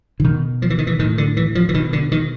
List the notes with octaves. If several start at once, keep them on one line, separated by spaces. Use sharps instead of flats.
D3
B2 D#3
F3
E3
D#3
E3
A2 D#3
D3
E3
F3
E3
B2 D#3
D3
D#3